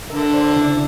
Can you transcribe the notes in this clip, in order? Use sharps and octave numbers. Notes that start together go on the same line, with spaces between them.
D3 A#4 E5
C5 D5 C6
C#3 D4 E4